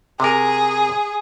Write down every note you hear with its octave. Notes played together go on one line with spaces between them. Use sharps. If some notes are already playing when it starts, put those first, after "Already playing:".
C3 G#4 A#4